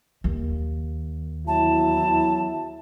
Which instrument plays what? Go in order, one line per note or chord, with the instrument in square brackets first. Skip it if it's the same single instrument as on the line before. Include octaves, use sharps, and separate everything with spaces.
[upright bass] D#2
[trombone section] E2 F#3 E4 [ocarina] A5